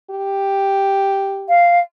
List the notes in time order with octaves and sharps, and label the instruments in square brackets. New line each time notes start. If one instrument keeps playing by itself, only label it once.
[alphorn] G4
[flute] F5